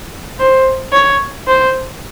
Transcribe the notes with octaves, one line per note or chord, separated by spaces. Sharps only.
C5
C#5
C5